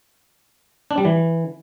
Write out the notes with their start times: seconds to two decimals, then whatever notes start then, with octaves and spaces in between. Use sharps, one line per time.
0.91 D4
0.98 G3
1.05 E3